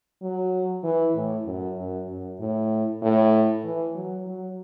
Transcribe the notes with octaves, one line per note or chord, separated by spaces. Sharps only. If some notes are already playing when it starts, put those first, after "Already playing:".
F#3
E3
A2
F#2
F#2
F#2
A2
A2
E3
F#3
F#3